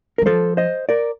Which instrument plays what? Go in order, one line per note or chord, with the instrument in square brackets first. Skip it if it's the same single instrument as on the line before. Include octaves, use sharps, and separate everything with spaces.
[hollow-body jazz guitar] A#4
[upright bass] G3
[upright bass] F3 [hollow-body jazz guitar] A4 C5
[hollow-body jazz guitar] C5 D#5
A#4 D5